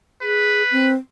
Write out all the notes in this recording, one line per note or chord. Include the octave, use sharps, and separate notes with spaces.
G#4 B4
C4